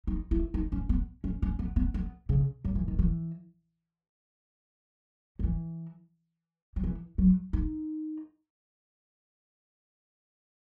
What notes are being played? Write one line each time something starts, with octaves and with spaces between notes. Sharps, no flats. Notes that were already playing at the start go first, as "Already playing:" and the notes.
D#4
E4
D#4
C#4
B3
C#4
C#4
B3
B3
B3
C#3
F#3
E3
D#3
E3
F#3
E3
F#3
E3
F#3
D#4